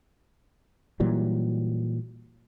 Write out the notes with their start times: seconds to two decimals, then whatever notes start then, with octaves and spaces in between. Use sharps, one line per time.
1.00 A#2 E3 F#3 G3